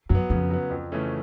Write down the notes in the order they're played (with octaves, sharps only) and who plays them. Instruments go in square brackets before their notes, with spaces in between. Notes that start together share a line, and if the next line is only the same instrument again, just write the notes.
[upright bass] F#2 [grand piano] F#3
[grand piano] B3
[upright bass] F2 [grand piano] C#3
[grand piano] F#3 B3
F2
C#3 E3 A3 C#4